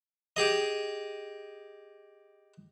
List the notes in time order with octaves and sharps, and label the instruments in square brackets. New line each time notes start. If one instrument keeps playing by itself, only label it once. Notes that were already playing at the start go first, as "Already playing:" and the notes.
[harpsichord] G4 G#4 D#5